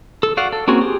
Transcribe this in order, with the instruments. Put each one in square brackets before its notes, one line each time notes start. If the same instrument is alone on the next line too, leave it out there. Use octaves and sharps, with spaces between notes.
[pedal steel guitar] A4
F#4 D5 F5 F#5
A4
A#3 C4 C#4 F#4 G#4
G4 G#4